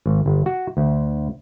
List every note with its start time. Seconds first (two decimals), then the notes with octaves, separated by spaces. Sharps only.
0.06 G#1
0.26 G1
0.46 F#4
0.77 D2